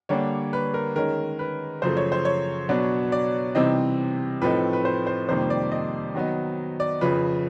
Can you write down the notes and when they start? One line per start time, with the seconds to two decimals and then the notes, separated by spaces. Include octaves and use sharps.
0.09 D3 G3 A#3 D4 C#5
0.53 B4
0.74 A#4
0.96 D#3 G#3 C#4 A#4
1.39 B4
1.82 F#2 C#3 F3 A3 C5
1.97 C#5
2.12 C5
2.25 C#5
2.69 B2 F#3 B3 D4
3.12 D5
3.55 C3 E3 G3 C4 D#4 D#5
4.42 A2 F3 A3 C4 D#4 B4
4.73 B4
4.85 C5
5.07 C5
5.28 F2 C3 D#3 G3 A#3 C5
5.50 D5
5.72 D#5
6.15 D#3 F#3 B3 D#4
6.80 D5
7.01 F2 C#3 F3 B4